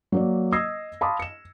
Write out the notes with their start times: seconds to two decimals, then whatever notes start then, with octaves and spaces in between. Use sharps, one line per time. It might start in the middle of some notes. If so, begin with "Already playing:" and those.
0.12 F#3 A#3 D5
0.52 D#5 D#6 E6 G#6 A#6 C7
1.01 F5 A5 B5 C6 D6 D#6
1.20 C#7 E7